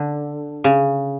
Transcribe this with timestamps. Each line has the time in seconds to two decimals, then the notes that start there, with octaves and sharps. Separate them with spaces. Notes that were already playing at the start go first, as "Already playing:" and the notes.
Already playing: D3
0.64 C#3